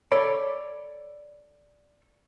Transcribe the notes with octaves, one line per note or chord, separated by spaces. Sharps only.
A4 C#5 D5 B5